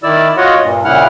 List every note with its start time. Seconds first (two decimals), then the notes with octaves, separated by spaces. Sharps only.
0.03 D#3 E4 D5 E6
0.37 F4 F#4 C#5 D#5 F#5
0.62 G2 A#2
0.85 A#2 C#3 E4 F#5 F6